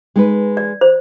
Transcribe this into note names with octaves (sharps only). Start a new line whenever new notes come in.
G#3 D#4 B4
D5
C5